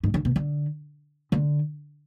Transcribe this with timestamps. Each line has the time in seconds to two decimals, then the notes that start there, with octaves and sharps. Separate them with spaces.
0.03 G#2
0.14 D3
0.25 B2
0.36 D3
1.32 D3